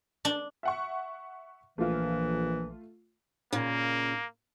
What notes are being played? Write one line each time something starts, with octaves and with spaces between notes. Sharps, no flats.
D4
E5 F#5 C#6
A#1 E3 A3 F4
A#2 C#3 A#3